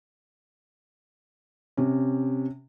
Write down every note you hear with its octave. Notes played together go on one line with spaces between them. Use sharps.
C3 C#4